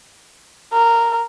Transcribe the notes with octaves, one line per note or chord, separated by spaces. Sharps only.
A#4